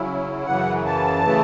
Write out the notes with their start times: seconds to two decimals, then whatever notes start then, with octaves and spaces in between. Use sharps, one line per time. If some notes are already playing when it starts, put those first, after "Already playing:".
Already playing: C#3 F#3 C#4 E4
0.46 F#2 C#3 E3 F#5
0.86 A5
1.24 C#3 E3 A3